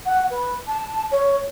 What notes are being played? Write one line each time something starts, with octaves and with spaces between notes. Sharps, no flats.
F#5
B4
A5
C#5